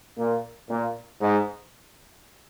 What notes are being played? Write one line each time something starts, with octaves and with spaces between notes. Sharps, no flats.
A#2
A#2
G#2